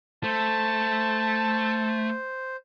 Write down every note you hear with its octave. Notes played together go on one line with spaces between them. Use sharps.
A3 C5 A5